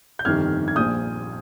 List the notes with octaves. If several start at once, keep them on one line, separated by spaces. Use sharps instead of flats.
G6
G1 F2 C3 D#3 F6 G#6
G#6
A#1 A#2 F3 D#6 G6